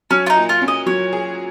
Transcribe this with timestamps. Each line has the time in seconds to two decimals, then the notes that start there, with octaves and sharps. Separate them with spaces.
0.11 F#3 C#4
0.26 F4
0.30 D#4
0.36 A#2
0.49 F4
0.62 C#4
0.68 D#5
0.86 F#3 C#5
1.13 G#4